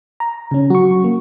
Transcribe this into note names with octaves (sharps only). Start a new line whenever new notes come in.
A#5
C#3 C#4
F#3 F#4 C#6
A#3